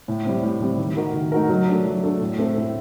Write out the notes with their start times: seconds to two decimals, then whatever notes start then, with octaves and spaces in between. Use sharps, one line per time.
0.08 A2
0.25 G3 C4
0.43 A2
0.60 G3 C4
0.78 D#3
0.97 A3 D#4 F#4 A#4
1.14 D#3
1.32 A3 D#4 F#4 A#4
1.49 F#3
1.68 A3 D4
1.86 F#3
2.04 A3 D4
2.21 A2
2.39 A3 C4
2.57 A2